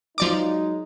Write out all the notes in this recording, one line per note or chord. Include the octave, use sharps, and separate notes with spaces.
F3 F#3 G#3 D#4 D5 D6